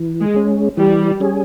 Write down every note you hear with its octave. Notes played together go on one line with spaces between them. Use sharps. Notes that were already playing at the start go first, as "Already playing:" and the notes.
Already playing: E3
G#3
G#3 C#4
E3 G3
G3 C#4 G#4